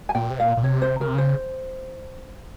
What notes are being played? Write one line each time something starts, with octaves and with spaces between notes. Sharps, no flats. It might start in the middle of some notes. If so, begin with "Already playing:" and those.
G#5
A#2 G5
C3
A#2 F5
A#2
C3 C#5
C5
C#3 A#4
C3
C#3 C5